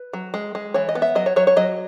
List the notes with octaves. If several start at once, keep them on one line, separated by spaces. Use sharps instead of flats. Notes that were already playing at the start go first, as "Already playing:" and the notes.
Already playing: B4
F#3
G#3
G#3
E3 C#5
D#5
B3
E5
F#3 D#5
C#5
F#3 C#5
C#5
F#3 D#5